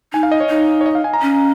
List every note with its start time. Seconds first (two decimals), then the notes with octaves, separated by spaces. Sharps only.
0.13 D#4 G#5
0.23 F5
0.32 D#5
0.40 C#5
0.49 D#4
0.81 C#5
0.86 D#5
0.95 F5
1.04 G#5
1.13 A#5
1.22 C#4